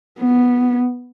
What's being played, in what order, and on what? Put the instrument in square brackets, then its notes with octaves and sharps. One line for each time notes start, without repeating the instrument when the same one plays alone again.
[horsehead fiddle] B3